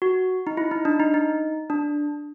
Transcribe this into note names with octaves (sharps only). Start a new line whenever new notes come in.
F#4
D#4
E4
D#4
D4
D#4
D#4
D4